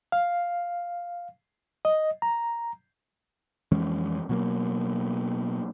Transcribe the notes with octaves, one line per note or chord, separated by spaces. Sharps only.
F5
D#5
A#5
F2 E3 G#3 C#4
B2 F#3 A#3